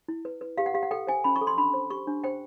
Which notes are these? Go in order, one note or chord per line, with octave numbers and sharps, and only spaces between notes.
E4
B4
B4
G4 F5
F#5
G4 F5
F#5
A4 G5
C5 G#5
C#4 B5
C#6
A4
C6
D4 B5
C5
G4 C#6
D4
C5 G5